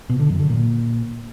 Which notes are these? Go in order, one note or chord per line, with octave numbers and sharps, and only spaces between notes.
B2
D3
F#2
D3
A#2